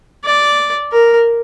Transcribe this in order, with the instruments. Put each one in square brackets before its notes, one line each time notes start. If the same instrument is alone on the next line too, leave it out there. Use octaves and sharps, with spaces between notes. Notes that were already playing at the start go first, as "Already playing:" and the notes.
[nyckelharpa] D5
A#4